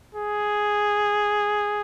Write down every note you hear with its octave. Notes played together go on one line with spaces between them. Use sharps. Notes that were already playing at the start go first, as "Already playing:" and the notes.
G#4